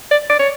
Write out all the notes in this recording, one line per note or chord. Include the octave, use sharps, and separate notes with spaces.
D5
D5
C#5